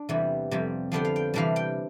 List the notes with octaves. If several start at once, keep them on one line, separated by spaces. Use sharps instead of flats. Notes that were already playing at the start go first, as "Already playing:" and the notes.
Already playing: D4
E2 C3 E3 G3
F2 C3 G3
D3 F3 B3 D4 G5
F5
G5
C3 E3 G3 D4 F5
G5